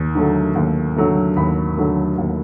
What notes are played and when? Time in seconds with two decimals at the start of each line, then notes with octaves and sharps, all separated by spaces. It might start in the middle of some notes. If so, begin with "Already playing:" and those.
Already playing: D#2
0.15 D3 F#3 A3
0.55 D#2
0.96 D3 F#3 A3
1.36 D#2 B5
1.77 D3 F#3 A3
2.18 D#2